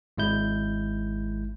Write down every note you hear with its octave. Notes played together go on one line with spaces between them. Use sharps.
G#1 G#3 E4 G6